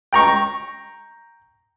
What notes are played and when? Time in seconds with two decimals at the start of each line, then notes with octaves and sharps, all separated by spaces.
0.13 G5 A#5 C#6